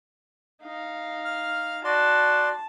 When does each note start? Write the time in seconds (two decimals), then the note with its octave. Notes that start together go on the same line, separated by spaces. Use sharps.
0.63 D#4 F5
1.25 F6
1.85 F#4 D5 A5 C6